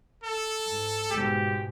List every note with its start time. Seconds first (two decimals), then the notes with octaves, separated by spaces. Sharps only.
0.24 A4
0.65 G#2
1.11 G#2 B2 G#3 G4